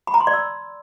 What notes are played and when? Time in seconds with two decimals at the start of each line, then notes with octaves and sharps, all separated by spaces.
0.07 B5
0.14 A#5
0.21 C6
0.27 D5
0.34 E6